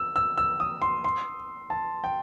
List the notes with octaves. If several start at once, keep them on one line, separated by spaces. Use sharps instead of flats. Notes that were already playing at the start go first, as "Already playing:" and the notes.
Already playing: E6
E6
E6
D#6
C6
C6
A5
G5